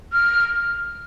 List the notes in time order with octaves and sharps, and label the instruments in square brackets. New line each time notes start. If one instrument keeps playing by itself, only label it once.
[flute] F6